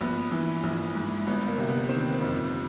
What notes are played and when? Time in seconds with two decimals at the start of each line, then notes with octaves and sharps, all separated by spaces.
0.01 A#1 B3
0.32 E3
0.63 A#1
0.95 G#2
1.27 G1 B3
1.48 A#3
1.58 C3
1.69 B3
1.89 D#3 C4
2.21 F2